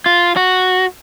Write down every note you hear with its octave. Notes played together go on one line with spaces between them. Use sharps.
F4
F#4